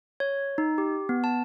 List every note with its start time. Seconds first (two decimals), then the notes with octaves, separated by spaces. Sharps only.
0.20 C#5
0.58 D#4
0.78 G4
1.09 B3
1.24 A5